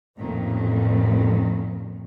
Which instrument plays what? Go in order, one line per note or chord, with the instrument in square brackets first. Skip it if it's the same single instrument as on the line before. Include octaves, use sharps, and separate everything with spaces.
[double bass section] A1 [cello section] F2 A#2 D#3